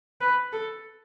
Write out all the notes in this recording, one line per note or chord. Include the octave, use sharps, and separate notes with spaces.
B4
A4